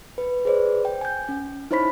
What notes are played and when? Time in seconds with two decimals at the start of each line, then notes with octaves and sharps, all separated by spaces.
0.18 B4
0.45 G#4 B4 C5 D5
0.85 G5
1.01 G#5 G6
1.29 C#4
1.71 D#4 E4 C5 C#5 B5 B6